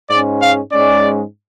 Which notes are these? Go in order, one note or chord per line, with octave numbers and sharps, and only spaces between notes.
G#2 G#3 C#4 D5
F5
G#2 G#3 C#4 D5